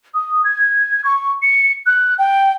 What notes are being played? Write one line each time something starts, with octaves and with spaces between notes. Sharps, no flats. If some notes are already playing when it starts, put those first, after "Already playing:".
D#6
G#6
C#6
C#7
F#6
G5